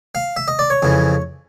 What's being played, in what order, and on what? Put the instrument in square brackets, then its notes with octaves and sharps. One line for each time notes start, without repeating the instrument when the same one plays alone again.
[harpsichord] F5
E5
D#5
D5
C#5
F2 C#3 E3